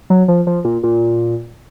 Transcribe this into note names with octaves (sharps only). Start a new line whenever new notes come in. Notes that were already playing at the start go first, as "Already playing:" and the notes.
F#3
F3
F3
A#2
A#2